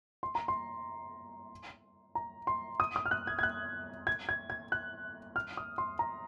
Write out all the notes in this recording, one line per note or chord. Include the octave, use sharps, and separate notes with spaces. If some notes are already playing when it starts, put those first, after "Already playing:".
C6
A#5
C6
A#5
C6
D#6
D#6
F6
F#6
G#6
G#6
F#6
G#6
G#6
G#6
F#6
F6
D#6
C6
A#5